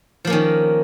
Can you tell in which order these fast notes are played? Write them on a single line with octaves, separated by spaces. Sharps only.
F3 A#3 C#4 D#3